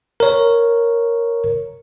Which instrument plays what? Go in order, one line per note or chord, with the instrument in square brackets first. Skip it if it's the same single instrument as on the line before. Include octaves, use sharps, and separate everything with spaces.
[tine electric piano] A#4 C#5